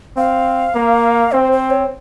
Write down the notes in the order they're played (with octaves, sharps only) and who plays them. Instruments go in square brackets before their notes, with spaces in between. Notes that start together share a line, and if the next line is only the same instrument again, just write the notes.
[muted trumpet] C4 [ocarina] F5
[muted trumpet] A#3
[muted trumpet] C4 [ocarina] C5
[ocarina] C5
C#5